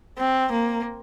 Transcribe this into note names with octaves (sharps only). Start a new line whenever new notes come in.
C4
A#3